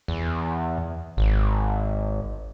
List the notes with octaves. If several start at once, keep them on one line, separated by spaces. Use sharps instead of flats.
E2
G#1